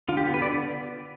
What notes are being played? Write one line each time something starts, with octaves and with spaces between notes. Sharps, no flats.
D3 F4
G4
B3
B4
D3 D5